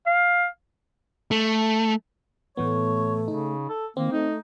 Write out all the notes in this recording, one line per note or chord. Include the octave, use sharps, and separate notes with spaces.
F5
A3
A2 E3 A3 B3 C#5
C#3 D#4
A4
D#3 A#3 C4
A3 D#4